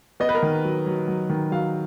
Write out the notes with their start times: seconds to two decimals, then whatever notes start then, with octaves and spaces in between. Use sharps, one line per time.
0.20 B3 D#5
0.29 B4
0.35 A#4
0.42 D#3
0.64 F#3
0.86 F#3
1.08 F#3
1.30 D#3
1.51 F#3 F5